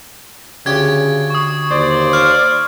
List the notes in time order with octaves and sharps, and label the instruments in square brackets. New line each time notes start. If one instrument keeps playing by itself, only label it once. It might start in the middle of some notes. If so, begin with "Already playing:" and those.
[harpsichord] D2 G4 [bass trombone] C#3 [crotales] G#6
[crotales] C#6 D#6
[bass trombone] D#2 [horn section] C5 D5
[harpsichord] F5 D6 [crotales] F6